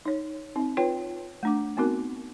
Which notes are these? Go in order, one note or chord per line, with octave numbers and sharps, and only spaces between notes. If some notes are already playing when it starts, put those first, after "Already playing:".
D#4 C#5
C4 D#4
F4 B4 C#5 G5
A3 D4 D6
B3 C4 D#4 F#4 A#4